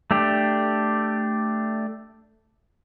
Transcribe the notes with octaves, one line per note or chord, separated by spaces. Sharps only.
A3 D4 G4